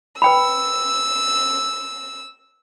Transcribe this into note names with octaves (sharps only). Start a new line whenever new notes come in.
B4 G5 B5 E6